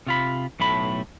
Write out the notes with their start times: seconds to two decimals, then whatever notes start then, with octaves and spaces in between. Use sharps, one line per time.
0.07 C3 F4 B5
0.60 B1 A2 A3 B5